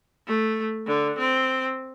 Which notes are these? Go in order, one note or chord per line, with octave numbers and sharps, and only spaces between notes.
A3
D3
C4